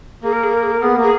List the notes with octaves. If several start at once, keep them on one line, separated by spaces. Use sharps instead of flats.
A#3 G#4
A#4
G#4
A#4
G#4
A#4
B3 G#4
A#3
G#4